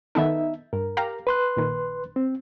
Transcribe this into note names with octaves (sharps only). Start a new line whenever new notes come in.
D#3 B3 D#4 A4 E5
G2 A#4
G4 F5 A#5
B4 C6 F#6
A#1 D#3
C4